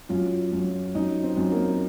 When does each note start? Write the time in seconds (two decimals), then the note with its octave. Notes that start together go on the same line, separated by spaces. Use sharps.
0.09 F#2 F4
0.53 F#2
0.95 F#2 D#4
1.23 C4
1.37 F#2
1.52 A#3